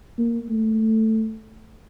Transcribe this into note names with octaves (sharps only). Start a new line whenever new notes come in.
A#3
A3